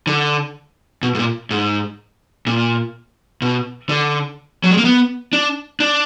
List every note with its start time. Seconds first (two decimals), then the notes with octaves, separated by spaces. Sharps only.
0.07 D3
1.03 B2
1.15 G#2
1.19 A#2
1.51 G#2
2.47 A#2
3.42 B2
3.89 D3
4.64 F#3
4.71 G#3
4.78 A#3
4.85 B3
5.33 D4
5.80 D4